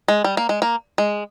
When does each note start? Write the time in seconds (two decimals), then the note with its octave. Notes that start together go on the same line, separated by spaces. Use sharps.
0.08 G#3
0.24 G3
0.37 A#3
0.49 G#3
0.62 A#3
0.98 G#3